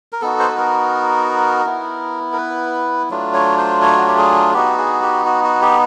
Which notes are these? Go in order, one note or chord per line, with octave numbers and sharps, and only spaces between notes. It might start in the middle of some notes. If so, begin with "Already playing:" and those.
A#4
B3 D#4 F#4 A4
C5
B4
A#4
B3 E4
A#4
B4
F#3 A3 D4 F4
C#5
C5
C#5
F#4
G4
G#4
B3 D#4 F#4 G4
G#4
G4
F#4
F#4
G4